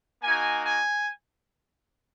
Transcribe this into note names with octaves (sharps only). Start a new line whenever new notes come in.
A#3 D#4 F#4 G#5
G#5